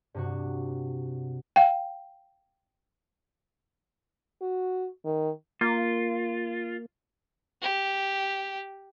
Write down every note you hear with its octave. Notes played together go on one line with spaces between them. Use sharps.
G2 C3 F#4
F5 G5
F#4
D#3
A#3 F4
G4